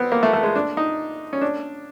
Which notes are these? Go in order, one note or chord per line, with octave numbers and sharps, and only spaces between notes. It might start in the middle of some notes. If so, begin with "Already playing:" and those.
Already playing: B3 C4
A#3
A3
A3
G#3
D4
D#4
C#4
D4